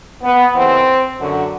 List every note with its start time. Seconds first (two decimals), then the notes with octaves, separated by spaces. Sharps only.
0.23 B3
0.54 D#2 C#3 E3 C4
1.19 F#2 D3 F#4